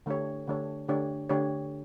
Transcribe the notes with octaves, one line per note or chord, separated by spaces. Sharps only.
D3 A3 D4 G4 C#5
D3 A3 D4 G4 C#5
D3 A3 D4 G4 C#5
D3 A3 D4 G4 C#5